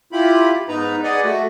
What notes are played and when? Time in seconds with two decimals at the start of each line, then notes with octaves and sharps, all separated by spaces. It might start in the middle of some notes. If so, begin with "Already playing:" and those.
0.12 E4 F4 G4 B5
0.69 G#2 B3 D#4 B4 A#5
1.03 G#4 B4 D5 D#5 F#5 G#5
1.25 A3 F#4